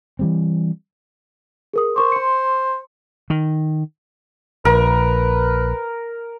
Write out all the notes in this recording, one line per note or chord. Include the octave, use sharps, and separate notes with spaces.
E3 G3 C4
G#4 A#4 D#6
A#4 C5 C#6 D6
C6 C#7
D#3
A#1 A#4 B4